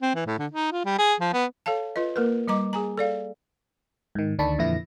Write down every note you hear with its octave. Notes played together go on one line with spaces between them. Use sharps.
C4
E3
A2
D3
D#4
F4
G3
G#4
F3
B3
A4 C#5 F5 A5
F4 B4 D#5
A#3 A#4 B4
G3 D#5 A#5 D6
G#4 G#5 A#5
A4 D5 F5
G#2 D#3
D2 D#3 D4 A5 B5 C#6
F2 A#2 D3 E3 E4 A#6